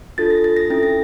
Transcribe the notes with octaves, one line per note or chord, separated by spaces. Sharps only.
D4 F4 A4 A6
A#6
A6
A#6
C#4 E4 A4 A6
A#6